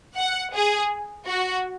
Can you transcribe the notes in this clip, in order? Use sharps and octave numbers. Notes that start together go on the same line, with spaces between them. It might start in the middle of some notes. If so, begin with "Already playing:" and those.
F#5
G#4
F#4